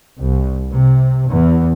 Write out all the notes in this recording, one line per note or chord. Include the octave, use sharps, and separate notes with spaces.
C2
C3
E2